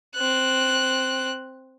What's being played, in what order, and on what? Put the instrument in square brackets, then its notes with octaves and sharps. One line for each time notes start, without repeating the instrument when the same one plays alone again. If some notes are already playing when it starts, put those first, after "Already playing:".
[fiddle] C4 F#6